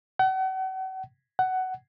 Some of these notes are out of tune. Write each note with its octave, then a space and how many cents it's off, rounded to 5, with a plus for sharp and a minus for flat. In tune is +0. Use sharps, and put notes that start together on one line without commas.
F#5 +40
F#5 +15